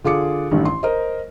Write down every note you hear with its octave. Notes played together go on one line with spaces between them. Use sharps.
D3 F4 G#4 D6 C#7
A1 G2 D#3
C6
A#4 C5 D#5